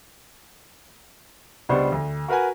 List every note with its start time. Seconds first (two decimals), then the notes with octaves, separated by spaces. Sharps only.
1.69 C#2 G3 B3 D4 C5 C#6
1.92 D2
2.28 F#4 A#4 B4 F#5 G#5